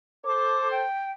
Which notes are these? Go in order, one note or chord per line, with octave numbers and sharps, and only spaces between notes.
A4 C5 D6
G5